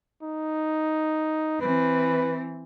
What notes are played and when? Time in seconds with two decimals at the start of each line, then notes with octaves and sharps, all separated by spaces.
0.22 D#4
1.61 E3 C4 B4